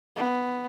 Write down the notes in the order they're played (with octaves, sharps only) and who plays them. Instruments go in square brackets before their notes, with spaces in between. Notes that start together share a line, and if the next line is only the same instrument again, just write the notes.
[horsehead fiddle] B3